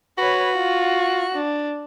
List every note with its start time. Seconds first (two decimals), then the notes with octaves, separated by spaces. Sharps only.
0.18 F#4 B4 C#5
0.56 F4
1.34 D4